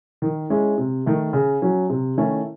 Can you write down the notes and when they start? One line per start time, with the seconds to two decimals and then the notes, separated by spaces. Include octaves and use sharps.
0.22 D#3
0.50 G#3 C#4 E4
0.78 C3
1.06 D#3 A3
1.33 C#3
1.62 F#3 C#4
1.90 C3
2.17 D#3 A3 C#4 E4